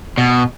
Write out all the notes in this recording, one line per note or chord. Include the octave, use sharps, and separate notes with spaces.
B2